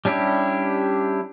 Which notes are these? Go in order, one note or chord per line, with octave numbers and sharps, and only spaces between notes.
G3 C#4 D4 E4 G4